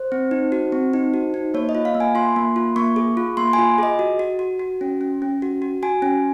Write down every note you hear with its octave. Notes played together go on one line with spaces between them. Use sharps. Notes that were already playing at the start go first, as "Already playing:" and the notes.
Already playing: C5
C4
D#4
F#4
C4
D#4
F#4
D#4
A#3 C#5
D#5
F4
F5
A#3
G#5
F4 C6
A#3
F4
A#3 C#6
G#4
F4
A#3 C6
G#5
F4
G#4 D#5
F#4
F#4
F#4
F#4
C#4
C#4
C#4
F#4
F#4
F#4 G#5
C#4